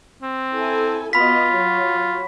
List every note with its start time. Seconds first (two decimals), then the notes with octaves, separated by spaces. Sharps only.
0.22 C4
0.54 E4 A4 G#5
1.13 B3 F4 F#4 D#5 B5 B6
1.53 F#3 F#4 C#5